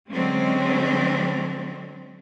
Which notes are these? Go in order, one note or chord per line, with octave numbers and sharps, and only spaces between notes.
D3 F#3 G#3 C4 C#4